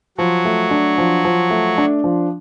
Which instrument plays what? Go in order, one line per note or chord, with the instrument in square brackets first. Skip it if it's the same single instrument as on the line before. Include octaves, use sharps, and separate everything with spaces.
[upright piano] F3 [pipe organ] F#3 F#4
[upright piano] A3
D4
F3
F3
A3
D4
F3